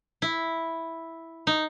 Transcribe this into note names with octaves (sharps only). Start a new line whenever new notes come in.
E4
D#4